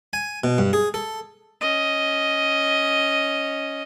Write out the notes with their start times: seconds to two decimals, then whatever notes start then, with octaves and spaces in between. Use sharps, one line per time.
0.13 G#5
0.44 B2
0.58 G2
0.73 G#4
0.94 A4
1.61 C#4 D#5